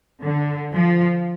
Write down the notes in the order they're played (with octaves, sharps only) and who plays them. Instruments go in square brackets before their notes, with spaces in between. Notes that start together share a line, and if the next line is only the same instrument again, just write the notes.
[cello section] D3
F3